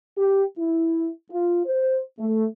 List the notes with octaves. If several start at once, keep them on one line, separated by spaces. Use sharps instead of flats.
G4
E4
F4
C5
A3